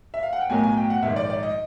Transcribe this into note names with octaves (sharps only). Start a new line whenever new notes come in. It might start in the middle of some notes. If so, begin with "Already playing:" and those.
E5
F5
F#5
G5
B1 A2 F#3 A#3 G#5
G#5
G5
F#5
A#1 G#2 D#3 E5
D5
D5
D#5